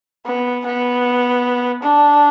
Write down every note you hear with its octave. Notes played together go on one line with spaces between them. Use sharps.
B3
B3
D4